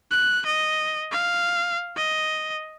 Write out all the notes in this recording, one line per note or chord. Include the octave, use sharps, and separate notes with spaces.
F#6
D#5
F5
D#5